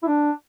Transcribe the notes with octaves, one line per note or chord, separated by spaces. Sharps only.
E4
D4